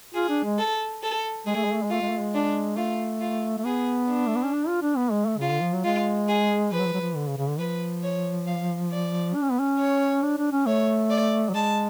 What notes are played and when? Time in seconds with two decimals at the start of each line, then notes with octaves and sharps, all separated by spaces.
0.14 F4 G#4
0.29 D4
0.44 G#3
0.58 A4
1.03 A4
1.47 G#3 G#4
1.55 A3
1.64 G#3
1.74 A3
1.83 G#3
1.90 A3 F4
2.02 G#3
2.10 A3
2.20 G#3
2.34 D4
2.77 A3 F4
3.21 F4
3.58 A3
3.65 B3 G#4
4.09 D4
4.27 A3
4.36 B3
4.45 C#4
4.53 D4
4.68 F4
4.82 D4
4.97 B3
5.11 G#3
5.26 A3
5.38 C#3 F4
5.49 D3
5.62 F3
5.73 F#3
5.84 G#3 F4
6.28 G#4
6.72 F3 B4
6.80 F#3
6.86 F3
6.94 F#3
7.01 F3
7.16 D3
7.27 C#3
7.38 C#3
7.49 D3
7.59 F3 B4
8.03 C#5
8.47 F5
8.92 D5
9.35 D4
9.43 C#4
9.51 B3
9.60 C#4
9.79 C#5
10.22 D4
10.38 D4
10.52 C#4
10.67 A3 C#5
11.10 D5
11.49 F#3
11.54 G#3 A5